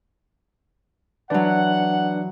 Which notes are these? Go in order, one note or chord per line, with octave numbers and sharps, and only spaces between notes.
E3 F#3 D4 B4 D5 F#5